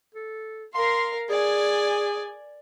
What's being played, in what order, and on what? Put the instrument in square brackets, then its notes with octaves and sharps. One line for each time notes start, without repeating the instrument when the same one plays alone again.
[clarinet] A4
[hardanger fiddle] A#4 F5 [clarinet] C6
[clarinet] G#4 [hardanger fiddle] D5 G#5